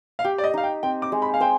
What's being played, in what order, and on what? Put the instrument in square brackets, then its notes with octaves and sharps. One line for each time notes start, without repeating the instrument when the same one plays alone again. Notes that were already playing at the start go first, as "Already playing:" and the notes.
[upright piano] F5
[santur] G4 [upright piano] G5
[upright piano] D5
D#5
[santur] D#4 [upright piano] F5
[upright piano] G5
[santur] C4 [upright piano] G5
[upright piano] D6
[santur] G#3
[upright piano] B5
F5
[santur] C5 [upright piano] G5